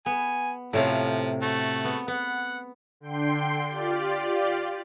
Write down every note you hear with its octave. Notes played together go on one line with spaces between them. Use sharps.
B3 G#5
A2 C3 F3 F5
A3 F#4
B3
B3 F#5
D3 G5 C6 C7
F4 G4 D5